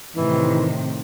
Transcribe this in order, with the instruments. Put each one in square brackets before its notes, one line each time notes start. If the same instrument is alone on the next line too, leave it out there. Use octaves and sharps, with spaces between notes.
[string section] A2 C3 D#3 [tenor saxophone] E3